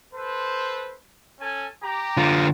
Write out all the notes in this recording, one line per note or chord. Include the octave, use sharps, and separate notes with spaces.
A4 B4 C5
C#4 A4 G#5
G4 A#5
D3 F4